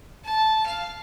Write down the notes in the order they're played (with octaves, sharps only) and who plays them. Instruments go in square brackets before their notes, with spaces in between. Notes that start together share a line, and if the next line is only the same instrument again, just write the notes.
[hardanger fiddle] A5
F5